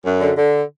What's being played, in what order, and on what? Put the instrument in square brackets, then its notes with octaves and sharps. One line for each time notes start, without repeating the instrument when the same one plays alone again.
[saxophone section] F#2
D3
D3